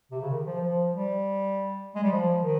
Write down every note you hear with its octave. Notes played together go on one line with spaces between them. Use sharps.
C3
C#3
D#3
F3
F3
G3
G#3
G3
F3
D#3